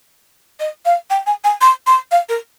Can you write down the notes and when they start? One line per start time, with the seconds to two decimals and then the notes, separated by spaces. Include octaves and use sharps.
0.60 D#5
0.85 F5
1.10 G5
1.27 G#5
1.44 G#5
1.61 C6
1.87 C6
2.11 F5
2.29 A#4